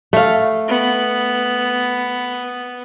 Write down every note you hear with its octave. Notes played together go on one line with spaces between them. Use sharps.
A3 F5
B3